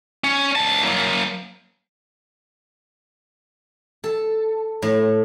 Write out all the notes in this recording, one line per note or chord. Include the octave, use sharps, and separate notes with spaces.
C#4
C#2 A5
F#3 A#3
A4
A2